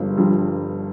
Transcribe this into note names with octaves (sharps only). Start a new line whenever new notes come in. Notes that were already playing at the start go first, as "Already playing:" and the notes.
Already playing: G1 G2 F3
G2 F3